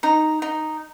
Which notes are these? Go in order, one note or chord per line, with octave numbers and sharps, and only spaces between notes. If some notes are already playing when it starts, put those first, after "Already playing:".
D#4 A#5
D#4